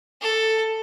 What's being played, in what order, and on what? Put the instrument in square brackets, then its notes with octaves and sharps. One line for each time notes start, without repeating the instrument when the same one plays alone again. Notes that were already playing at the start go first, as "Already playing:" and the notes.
[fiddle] A4